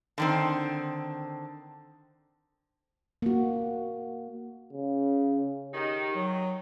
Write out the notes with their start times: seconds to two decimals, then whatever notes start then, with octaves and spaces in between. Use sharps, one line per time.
0.18 D3 D#3 C4
3.22 A#3 F#4
4.73 C#3
5.73 D#3 D#4 G4
6.15 F#3